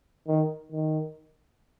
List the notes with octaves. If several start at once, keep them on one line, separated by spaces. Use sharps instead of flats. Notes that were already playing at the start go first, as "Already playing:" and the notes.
D#3
D#3